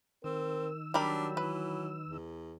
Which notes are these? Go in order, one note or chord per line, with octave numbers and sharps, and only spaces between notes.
D#3 C4 A#4 E6
F#3 G3 D4 A#4 B5
E3 B4
E2